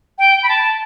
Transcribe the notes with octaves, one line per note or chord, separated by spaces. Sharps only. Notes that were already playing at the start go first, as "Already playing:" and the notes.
G5
B5
A5